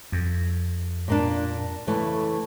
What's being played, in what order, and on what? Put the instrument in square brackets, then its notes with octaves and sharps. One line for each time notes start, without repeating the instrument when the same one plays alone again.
[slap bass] F2
[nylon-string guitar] A#2 A#3 D4
C#3 E3 A3